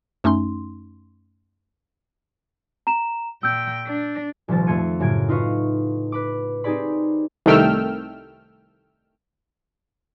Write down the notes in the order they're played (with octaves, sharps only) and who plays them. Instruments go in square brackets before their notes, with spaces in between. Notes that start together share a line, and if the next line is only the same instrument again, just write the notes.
[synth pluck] F#2 A3 C#4 D#4 C6
[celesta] A#5 E7
[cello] A#2 G5 [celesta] E6 G6
[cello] D4
[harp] D#1 C2 F3 A6
F2 A3 C5 G#6 C#7 D#7
F#2 A2 C#3 G#6 D7
D#4 F4 B4 D#5 F5 C#6
B4 B5 D6
C4 D#4 G4 G#4 D5 B5
[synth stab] C2 D#3 A3 G5 E6 F6